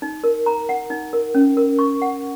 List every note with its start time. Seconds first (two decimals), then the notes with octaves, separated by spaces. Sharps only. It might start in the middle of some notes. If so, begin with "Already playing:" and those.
0.02 D#4
0.24 A#4
0.46 A#5
0.69 F#5
0.90 D#4
1.13 A#4
1.35 C#4
1.57 A#4
1.79 C#6
2.02 F#5